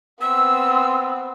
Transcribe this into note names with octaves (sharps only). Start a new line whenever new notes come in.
B3 C4 E6